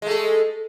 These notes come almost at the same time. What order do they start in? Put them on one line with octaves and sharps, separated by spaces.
G#3 A3 A4